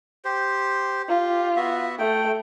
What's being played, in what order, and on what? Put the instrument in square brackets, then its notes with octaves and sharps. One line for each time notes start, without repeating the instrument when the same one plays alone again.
[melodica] G4 C5
[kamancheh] F4 [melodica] G4
[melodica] B3 F#4 E5
[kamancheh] A3 [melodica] G5